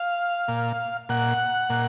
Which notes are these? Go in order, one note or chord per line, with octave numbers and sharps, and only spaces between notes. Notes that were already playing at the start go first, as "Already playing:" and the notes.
Already playing: F5
A#2
A#2 F#5
A#2